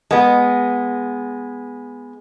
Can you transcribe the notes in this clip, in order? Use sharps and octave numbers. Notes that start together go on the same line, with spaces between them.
G#3 B3